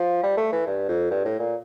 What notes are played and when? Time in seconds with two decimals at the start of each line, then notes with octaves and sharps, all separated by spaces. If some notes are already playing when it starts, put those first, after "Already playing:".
Already playing: F3
0.23 G3
0.37 A3
0.52 E3
0.67 G2
0.89 F2
1.11 G2
1.25 A2
1.39 A#2